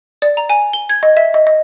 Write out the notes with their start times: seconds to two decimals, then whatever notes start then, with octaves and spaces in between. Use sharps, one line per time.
0.22 D5
0.37 A#5
0.50 G#5
0.73 G7
0.89 G#6
1.03 D#5
1.17 E5
1.34 D#5
1.47 D#5